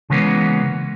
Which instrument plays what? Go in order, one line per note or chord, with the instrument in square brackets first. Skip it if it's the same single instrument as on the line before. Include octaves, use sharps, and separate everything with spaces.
[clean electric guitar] C#3 E3 G#3 A#3 B3 C#4